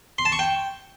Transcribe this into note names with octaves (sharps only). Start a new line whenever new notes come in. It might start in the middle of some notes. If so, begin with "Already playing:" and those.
C6
A5
C#6
G5